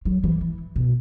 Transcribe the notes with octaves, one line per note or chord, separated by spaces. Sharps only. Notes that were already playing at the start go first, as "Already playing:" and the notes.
F#3
E3
E3
B2